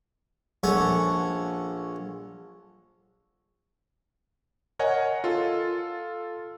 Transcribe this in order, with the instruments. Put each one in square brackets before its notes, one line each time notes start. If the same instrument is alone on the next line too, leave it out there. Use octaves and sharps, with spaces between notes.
[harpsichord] A#1 C#4 A4 C#5 F#5
[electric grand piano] A#4 C#5 D#5 F#5 G#5
F4 A4